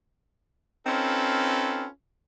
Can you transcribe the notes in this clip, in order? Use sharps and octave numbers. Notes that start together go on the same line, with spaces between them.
C4 C#4 D#4 F4 A4 B4